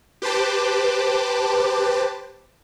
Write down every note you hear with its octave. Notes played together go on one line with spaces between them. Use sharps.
G4 B4 C5 A5 D6